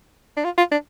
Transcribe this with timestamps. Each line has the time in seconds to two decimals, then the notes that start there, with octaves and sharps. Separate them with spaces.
0.37 D4
0.45 F4
0.58 F4
0.72 D4